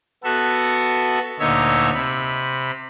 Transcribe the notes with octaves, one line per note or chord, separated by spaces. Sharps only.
B3 F#4 A4 E5
D2 A#2 D#4 C#5 E5 E6
C3 B5